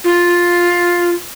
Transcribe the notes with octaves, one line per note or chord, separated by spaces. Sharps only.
F4